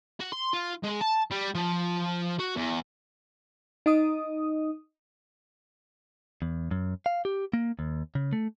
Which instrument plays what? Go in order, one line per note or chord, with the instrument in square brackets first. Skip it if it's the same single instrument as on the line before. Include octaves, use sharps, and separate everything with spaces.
[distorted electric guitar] F#4
C6
F4
G#3
A5
G3
F3
F#4
E2
[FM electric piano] D#4 D#5 D#6
[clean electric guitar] E2
F#2
F5
G4
A#3
D#2
C#3
A3